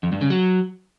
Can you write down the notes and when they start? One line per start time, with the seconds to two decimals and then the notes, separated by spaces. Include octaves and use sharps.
0.03 F2
0.12 G2
0.21 C#3
0.30 F#3